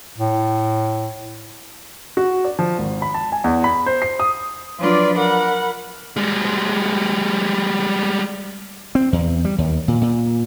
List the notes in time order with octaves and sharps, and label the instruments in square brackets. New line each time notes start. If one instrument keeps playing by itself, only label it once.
[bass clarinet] A2
[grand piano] F#4
D5
F3
G#1
B5
A5
G#5
E2
B5
C5
C7
D#6
[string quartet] F3 F#3 D4 F4 B4 D5
A#4 F#5 B5
[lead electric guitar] G3 G#3
[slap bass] C4
E2
G3
D#2
A#2
A#2